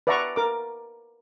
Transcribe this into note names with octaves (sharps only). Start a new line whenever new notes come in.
B4 D5 E5 F#5 A#5 C#6
A#4 D6